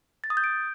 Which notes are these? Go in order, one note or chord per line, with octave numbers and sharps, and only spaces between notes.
A6
D#6
G6
D7